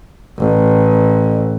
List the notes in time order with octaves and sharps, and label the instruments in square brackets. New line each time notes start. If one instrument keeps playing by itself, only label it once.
[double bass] A1